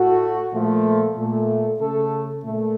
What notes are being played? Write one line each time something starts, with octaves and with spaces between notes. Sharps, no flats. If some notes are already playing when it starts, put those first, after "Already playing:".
Already playing: A2 A3 F#4
A#2 F3 A3
A#2 A3
C#3 A3 A4
A#2 A3